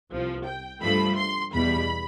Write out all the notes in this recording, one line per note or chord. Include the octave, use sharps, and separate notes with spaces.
C2 C3 F3
G5
G2 F3 A3 B5
C6
E2 B2 G3 B5